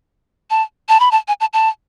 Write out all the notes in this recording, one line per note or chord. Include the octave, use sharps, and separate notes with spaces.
A5
A5
B5
A5
G#5
A5
A5